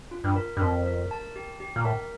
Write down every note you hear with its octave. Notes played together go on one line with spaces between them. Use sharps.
F4
G2
A#4
G2
F2 A#4
A#4
A5
G4
G4
A#2
A2 A#4